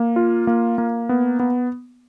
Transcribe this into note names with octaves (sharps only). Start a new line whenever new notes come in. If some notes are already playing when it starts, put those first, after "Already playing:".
Already playing: A#3
F4
A#3
A#3
B3
B3